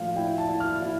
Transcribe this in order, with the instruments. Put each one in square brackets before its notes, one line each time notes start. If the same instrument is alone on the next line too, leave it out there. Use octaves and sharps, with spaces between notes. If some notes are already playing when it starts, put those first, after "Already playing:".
Already playing: [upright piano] A2 F3 F5
E4 G5
A5
E4
F6
E4